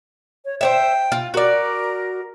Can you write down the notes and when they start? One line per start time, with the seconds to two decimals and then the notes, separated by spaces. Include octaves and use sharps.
0.45 C#5
0.61 C5 C#5 E5 G5
1.12 F4
1.34 F#4 A#4 D5